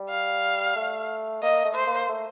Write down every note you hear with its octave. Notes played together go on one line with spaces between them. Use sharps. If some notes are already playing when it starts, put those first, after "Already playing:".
Already playing: G3
F5
A3
A#3 D#5
A3
C5
A#3
A3